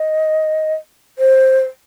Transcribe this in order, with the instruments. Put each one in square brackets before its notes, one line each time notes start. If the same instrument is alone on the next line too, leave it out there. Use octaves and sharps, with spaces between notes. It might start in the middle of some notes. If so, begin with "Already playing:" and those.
Already playing: [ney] D#5
C5